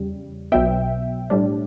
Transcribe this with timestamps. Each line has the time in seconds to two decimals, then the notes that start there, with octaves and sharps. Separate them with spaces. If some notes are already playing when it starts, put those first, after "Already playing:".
Already playing: E2 C#3 G3
0.52 B1 B2 F#3 B3 E5 G5
1.30 A2 G3 D4